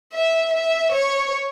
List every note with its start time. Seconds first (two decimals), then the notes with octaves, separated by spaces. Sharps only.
0.13 E5
0.53 E5
0.92 C#5